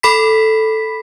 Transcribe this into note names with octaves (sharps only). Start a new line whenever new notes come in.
A4 B5 B6